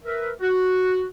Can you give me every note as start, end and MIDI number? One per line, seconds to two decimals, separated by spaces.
0.04 0.31 70
0.04 0.31 71
0.04 0.31 76
0.41 1.04 66